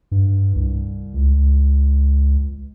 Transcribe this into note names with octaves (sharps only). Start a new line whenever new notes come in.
G2
C2
C#2